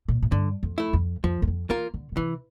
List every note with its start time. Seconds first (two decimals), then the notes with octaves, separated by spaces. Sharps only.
0.08 A#2
0.22 A2
0.32 G2 D3
0.63 F2
0.78 A3 E4
0.93 F2
1.24 F2 F3
1.42 E2
1.47 F2
1.70 E3 A#3 F4 A#4
1.94 D3
2.12 D3
2.17 C3 E3